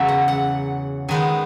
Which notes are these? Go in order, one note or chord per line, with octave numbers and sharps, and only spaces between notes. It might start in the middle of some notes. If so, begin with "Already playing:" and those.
Already playing: E2 C#3 F#3 E5
F#5
F#5
D#3 G#3 B3 D#4 G#5